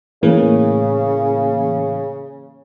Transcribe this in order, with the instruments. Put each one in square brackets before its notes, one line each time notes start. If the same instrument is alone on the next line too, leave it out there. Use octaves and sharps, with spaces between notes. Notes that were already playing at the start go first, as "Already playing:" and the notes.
[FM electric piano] A2 E3 A#3 [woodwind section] C#3